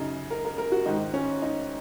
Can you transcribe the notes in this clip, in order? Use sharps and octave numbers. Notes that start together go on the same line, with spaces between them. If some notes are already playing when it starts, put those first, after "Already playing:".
Already playing: F#2 C#3 D#4
A#4
A#4
A#4
F#4
G#2 D#3 D#4
C#4
D#4